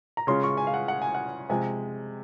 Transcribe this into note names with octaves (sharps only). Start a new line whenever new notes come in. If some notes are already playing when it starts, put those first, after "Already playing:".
A#5
C#3 G#3 C#4 F4 C6
C#6
G#5
F5
F#5
F#5
G#5
F#5
C3 F3 G#3 G#5